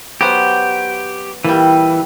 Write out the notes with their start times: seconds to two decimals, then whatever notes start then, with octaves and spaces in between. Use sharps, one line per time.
0.21 F#3 B3 G4 C5
1.45 A#2 E3 G3